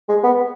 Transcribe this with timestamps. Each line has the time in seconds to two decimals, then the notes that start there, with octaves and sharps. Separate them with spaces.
0.09 G#3
0.24 B3